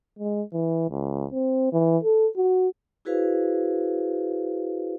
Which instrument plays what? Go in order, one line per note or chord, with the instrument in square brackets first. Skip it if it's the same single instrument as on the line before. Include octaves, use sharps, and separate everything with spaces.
[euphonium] G#3
E3
C#2
C4
E3
A4
F#4
[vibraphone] E4 F#4 G#4 B4 C5 F5